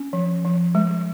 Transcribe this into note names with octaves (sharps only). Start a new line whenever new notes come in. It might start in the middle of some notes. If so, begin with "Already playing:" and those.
Already playing: C#4
F3
F3
G#3